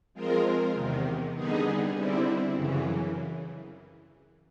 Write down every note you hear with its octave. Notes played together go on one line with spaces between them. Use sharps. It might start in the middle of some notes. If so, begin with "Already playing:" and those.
F3 G#3 C4 F4 A#4
E2 C3 D#3
D3 G3 B3 D#4 G#4
D3 G3 C4 E4
F#2 C#3 E3